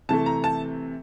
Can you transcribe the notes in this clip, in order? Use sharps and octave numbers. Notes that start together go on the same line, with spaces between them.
C3 E3 A3 A5
A#5
A5